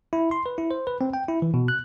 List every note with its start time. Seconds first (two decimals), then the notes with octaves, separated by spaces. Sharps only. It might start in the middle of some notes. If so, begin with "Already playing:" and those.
0.13 E4
0.31 C6
0.46 B4
0.58 E4
0.71 C5
0.87 B4
1.01 C4
1.14 G5
1.28 E4
1.42 E3
1.54 B2
1.68 F#6